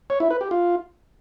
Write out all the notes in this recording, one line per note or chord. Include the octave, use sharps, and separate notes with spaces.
C#5
E4
B4
G4
F4